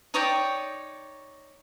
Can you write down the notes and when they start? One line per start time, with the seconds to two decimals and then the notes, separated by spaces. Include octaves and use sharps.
0.14 D#4 C#5 D5 G5